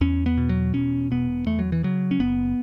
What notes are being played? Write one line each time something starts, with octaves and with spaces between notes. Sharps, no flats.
E2 C#4
B3
B2
F#3
E1 C#4
E1 B3
E2 A3
F#3
E3
C#3 F#3
C#4
F#1 B3